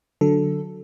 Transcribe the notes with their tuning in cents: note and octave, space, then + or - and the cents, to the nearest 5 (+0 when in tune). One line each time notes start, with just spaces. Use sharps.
D3 +0 F#3 +0 A4 +0